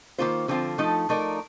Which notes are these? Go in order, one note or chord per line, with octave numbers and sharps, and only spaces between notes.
D#3 A#3 F4 C5
D3 F3 C4 F4 C5
F3 A3 D#4 A4
F3 A3 D#4 A#4 D5